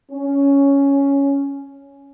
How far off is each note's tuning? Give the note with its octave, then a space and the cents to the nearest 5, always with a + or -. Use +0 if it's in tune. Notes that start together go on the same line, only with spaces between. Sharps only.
C#4 +5